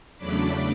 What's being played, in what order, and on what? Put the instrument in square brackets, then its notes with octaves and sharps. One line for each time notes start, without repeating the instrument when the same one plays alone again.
[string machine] E2 C#3 F#3 A3 D4 B5 D6